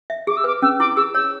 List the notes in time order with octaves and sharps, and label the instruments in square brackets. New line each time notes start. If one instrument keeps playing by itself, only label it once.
[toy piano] E5
[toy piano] G#4 [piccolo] D6
[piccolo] E6
[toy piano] B4 [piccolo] D6
[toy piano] C#4 [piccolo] E6
[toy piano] E4 [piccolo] D6
[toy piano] G#4 [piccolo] E6
[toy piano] C#5 [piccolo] E6